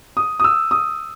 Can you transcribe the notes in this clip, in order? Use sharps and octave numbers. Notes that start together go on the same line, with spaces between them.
D#6
D#6
E6
D#6